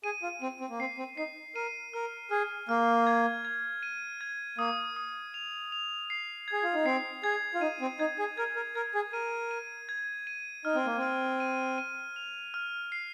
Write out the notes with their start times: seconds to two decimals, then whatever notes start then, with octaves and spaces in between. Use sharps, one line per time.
0.04 G#4 D#7
0.23 F4
0.42 C4 D#7
0.60 C4
0.70 A#3
0.79 C4 C7
0.98 C4
1.17 D#4 C7
1.55 A#4 D#7
1.94 A#4 F6
2.31 G#4 F6
2.69 A#3 F6
3.07 G#6
3.45 G#6
3.83 D#7
4.21 G#6
4.58 A#3 D#6
4.96 D#6
5.34 F7
5.72 F7
6.10 C7
6.48 G#4 G#6
6.63 F4
6.74 D#4
6.85 C4 C7
7.24 G#4 G#6
7.54 F4
7.61 D#4 D#7
7.81 C4
8.00 D#4 G#6
8.19 G#4
8.38 A#4 G#6
8.56 A#4
8.75 A#4 G#6
8.95 G#4
9.13 A#4 D#7
9.51 D#7
9.89 G#6
10.27 D#7
10.65 D#4 F6
10.75 C4
10.86 A#3
10.97 C4
11.03 F6
11.40 D#7
11.78 D#7
12.16 F7
12.54 F6
12.92 C7